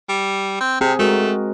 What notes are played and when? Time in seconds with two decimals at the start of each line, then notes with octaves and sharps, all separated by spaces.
0.09 G3
0.61 C4
0.81 C3 C4 G#4
0.99 G#3 A3 F#4 A#4